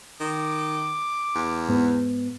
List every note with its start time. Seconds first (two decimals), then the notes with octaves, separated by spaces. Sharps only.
0.20 D#3 D6
1.35 E2
1.68 G#2 B3